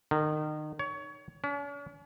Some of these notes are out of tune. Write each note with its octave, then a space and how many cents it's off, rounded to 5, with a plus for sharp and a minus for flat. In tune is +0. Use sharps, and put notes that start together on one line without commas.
D#3 -30
C#5 +25
C#4 +45